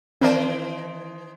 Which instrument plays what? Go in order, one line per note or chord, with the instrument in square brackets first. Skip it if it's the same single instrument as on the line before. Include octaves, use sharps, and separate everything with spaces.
[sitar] D#3 E3 C5 [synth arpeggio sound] C4 A#4 D5